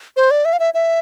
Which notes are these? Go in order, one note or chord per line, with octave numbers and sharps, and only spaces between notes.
C5
D5
E5
F5
E5
E5